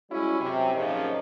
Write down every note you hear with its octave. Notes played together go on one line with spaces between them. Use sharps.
G3 G#3 C#4 E4 F#4
F#2 C3
F#2 A#2 C#3 F3 D#4